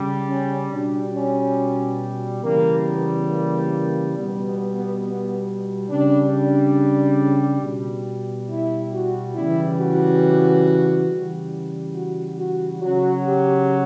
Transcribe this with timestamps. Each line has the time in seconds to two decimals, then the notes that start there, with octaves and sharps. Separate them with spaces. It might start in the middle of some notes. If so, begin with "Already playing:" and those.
Already playing: C#3 G3
0.27 C#4
0.69 B2 G3 D4
1.13 C#4
2.43 C#3 E3 G3 A#3
2.86 B3
3.30 A#3
3.73 A#3
4.16 B2 G3 B3
4.45 B3
4.75 B3
5.03 B3
5.89 C#3 G3 D4
6.33 D4
7.62 B2 G3
8.49 E4
8.93 F#4
9.35 C#3 E3 G3 E4
9.79 F#4
11.09 C#3 E3 G3
11.95 F#4
12.38 F#4
12.81 C#3 F#3 F#4
13.26 G4